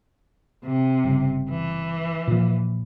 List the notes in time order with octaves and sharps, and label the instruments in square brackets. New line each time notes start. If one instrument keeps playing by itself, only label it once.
[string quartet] C3
[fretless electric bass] G1 C#3
[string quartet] E3
[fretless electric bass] A#2 F3